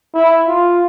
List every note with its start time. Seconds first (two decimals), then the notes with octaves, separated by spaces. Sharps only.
0.15 E4
0.48 F4